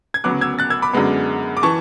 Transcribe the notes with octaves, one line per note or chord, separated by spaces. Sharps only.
G#6
D2 C#3 F#3 B3 D6 F#6
E6 G#6
F#6 A6
E6 G#6
B5 D6
F#2 D3 G#3 B3
D6
E3 A5 C#6